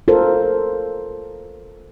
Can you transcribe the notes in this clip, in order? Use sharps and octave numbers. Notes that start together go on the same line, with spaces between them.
F4 A4 A#4 C5